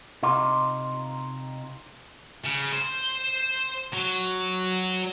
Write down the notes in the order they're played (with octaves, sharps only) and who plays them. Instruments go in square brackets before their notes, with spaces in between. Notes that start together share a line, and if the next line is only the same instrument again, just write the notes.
[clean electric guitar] C3 D#4 F4
[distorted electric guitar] C#3
C5
F#3